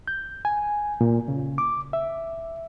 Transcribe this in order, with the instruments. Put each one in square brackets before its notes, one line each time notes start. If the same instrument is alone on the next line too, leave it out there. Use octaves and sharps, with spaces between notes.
[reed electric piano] G6
G#5
A#2
C#3
D6
E5